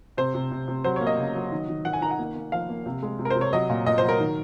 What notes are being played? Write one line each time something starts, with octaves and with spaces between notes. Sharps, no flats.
C3 C5
C3
C3
C3
F#3 C5
C#5
A#3
D#5
C#3
F#3
D#3
D#3
D#3 F#5
G#5
D#3 A#5
F#5
A#3
A#3
F3 F5
A#3
C3
G#3
C3
A#4
C5
C3
C#5
F#3 D#5
A#2
A#2 D#5
C5
F#3
A#4
D#3